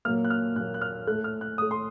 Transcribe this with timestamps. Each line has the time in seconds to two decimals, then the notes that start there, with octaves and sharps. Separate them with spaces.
0.05 A#2 F#3 A#3 F6
0.25 F#6
0.30 F6
0.56 A#2 F#3 A#3 F#6
0.74 F#6
0.82 F6
1.07 A3 F#6
1.11 A2
1.24 F6
1.41 F#6
1.58 A2 A3 D#6
1.71 C6